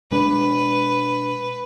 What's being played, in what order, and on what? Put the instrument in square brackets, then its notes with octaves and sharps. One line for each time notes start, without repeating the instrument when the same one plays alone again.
[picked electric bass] B2 G#3 D4 [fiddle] B4